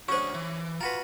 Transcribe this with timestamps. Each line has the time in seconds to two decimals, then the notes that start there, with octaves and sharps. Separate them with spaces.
0.09 C#4 D4 F#4 G#4 C5 C#6
0.34 E3
0.81 F4 F#4 B4 A#5 B5